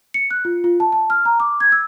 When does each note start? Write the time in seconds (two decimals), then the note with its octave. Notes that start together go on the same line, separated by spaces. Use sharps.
0.14 C#7
0.31 F#6
0.45 F4
0.64 F4
0.80 A5
0.92 A5
1.10 F6
1.25 A#5
1.40 D6
1.60 G#6
1.72 E6